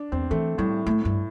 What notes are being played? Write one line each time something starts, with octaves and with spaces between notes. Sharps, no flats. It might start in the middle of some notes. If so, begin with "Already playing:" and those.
Already playing: D4
E2 C4
E3 A3
A2 G3
A2 A3
G2